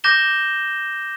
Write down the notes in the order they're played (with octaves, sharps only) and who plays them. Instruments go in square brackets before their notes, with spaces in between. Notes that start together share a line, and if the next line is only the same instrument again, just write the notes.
[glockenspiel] D6 G6 A#6 E7 G7